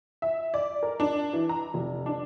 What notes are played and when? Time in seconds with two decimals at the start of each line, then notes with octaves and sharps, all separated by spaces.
0.22 E5
0.54 D5
0.83 A#4
1.00 D4
1.33 E3
1.49 A#5
1.74 F1
2.06 D4